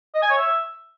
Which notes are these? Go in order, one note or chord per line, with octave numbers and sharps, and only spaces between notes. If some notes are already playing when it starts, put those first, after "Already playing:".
D#5
G#5
C#5
E5